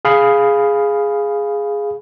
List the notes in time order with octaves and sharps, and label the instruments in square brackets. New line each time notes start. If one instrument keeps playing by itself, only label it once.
[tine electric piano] G#4 F5 B5